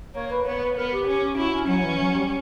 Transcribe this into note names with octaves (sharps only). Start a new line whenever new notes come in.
A#3 C#5
B4
B3 C#5
B4
B3 A#4
G4
C#4
E4 F#4
C#4
F#3 C#4
E3
F#3
G3